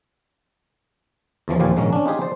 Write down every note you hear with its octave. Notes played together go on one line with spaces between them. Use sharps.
E2 E3 F3 C#4
D#2 A#2 F3 G4 F5 G#5
A#1 G#2 D#3 A#3 C#4
C#4 D4
D#4 F4 G4 G#4
C5 D5